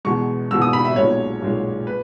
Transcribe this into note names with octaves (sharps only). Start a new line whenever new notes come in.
E2 B2 G#3 C#6
E2 B2 G#3 E6
D#6
B5
E5
B1 A#2 G#3 C#5
B1 A#2 G#3
B4